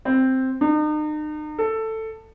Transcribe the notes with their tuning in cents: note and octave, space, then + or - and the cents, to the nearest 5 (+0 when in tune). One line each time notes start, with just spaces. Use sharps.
C4 +0
D#4 -40
A4 +10